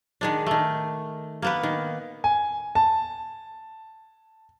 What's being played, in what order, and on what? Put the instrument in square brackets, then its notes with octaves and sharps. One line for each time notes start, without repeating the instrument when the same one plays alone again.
[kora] D#3 G#3 D4
D#3 A3
A#3 B3 B4
D#3
[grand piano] G#5
A5